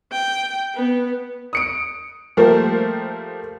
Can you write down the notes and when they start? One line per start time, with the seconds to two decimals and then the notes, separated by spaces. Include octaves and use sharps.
0.13 G5
0.75 B3
1.53 D#6 C#7 D7
2.37 F3 G3 A3 A#3 A#4 C5